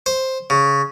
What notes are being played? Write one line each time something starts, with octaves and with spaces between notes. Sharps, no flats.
C5
C#3